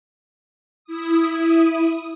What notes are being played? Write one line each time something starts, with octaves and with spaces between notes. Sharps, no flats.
E4 D#6